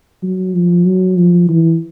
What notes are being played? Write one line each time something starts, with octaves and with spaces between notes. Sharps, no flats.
F#3
F3
F#3
F3
E3